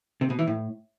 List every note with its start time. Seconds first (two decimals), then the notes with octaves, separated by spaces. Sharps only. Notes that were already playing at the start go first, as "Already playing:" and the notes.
0.21 C3
0.30 B2
0.39 E3
0.47 A2